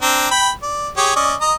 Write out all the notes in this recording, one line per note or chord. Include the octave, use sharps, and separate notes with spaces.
C4 D4 A#5
G5 B5
D5
G4 G#4 C#5
C#4 D5 D#5
D#5 A#5